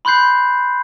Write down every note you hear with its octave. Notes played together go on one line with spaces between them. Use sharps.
B5 C6 F#6 G6 C7